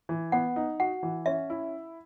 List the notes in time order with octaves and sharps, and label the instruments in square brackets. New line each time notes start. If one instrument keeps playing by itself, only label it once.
[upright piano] E3
[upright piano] B3 [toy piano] F#5
[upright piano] D#4
[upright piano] F#4 [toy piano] F#5
[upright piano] E3
[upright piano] C#4 [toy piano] E5
[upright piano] E4